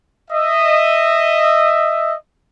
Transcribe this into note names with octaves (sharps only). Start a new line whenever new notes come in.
D#5 E5